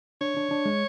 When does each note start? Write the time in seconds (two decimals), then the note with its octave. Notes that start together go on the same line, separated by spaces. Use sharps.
0.21 D4 C#5
0.37 D4
0.51 D4
0.66 G#3